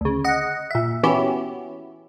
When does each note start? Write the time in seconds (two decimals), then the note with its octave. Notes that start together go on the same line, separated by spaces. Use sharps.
0.01 D2 C#3
0.24 D#5 F#5
0.71 A#2 E5
1.03 E3 B3 C#4 E4 F#4 G4